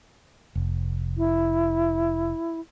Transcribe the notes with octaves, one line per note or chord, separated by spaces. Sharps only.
F1
E4